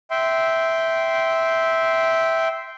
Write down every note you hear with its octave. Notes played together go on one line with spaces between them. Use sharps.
E5 G5 C6